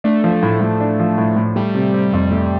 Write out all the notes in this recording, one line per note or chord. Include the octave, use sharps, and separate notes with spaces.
A3 D4
F3
A2
A2
D4
F3
A2
A2
G3 A3
C3
C4
F2
A3